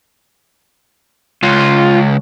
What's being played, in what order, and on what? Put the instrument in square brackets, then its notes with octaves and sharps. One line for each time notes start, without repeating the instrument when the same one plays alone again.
[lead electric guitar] C#2 [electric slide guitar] F4